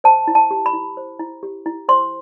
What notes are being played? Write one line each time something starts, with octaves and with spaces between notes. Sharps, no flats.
C5 A5
E4
A5
G4
B5
E4
C5
E4
G4
E4
C5 C6